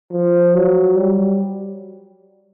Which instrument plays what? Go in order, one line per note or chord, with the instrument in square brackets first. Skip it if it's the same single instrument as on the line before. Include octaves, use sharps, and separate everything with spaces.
[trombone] F3
F#3
G3